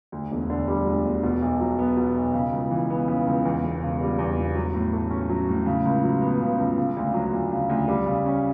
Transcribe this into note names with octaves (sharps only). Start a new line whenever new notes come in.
D2
E1
D3
G3
D2
E1
B2
B1
F#3
B3
B2
B1
C#3
C#2
E3
B3
C#3
C#2
E2
E1
C#3
G3
E2
E1
F#3
A2
A3
C#4
F#3
A2
C#3
C#2
F#3
B3
C#3
C#2
C#3
D2
F#3
D2
C#3
D2
G3
C#3
C#4